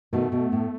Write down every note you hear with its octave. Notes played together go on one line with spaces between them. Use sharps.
B2 D#3 A3
B2
A2